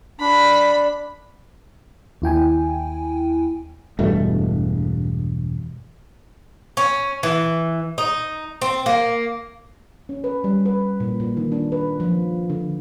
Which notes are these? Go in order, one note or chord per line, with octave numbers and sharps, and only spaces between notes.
D4 B5
D#2 E4 G5 G#5
E1 G2 B2 A3
C#4
E3
D#4
C4
A#3
C#4
B4
G3
B4
A#2
A#2
D#3
D4
B4
F3
D3